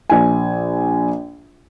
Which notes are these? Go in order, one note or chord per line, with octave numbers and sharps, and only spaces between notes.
A#1 G#5